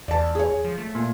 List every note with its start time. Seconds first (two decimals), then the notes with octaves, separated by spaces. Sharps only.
0.08 E2 D5 A5
0.35 G#4 C#5
0.64 F3
0.78 A3
0.95 A#2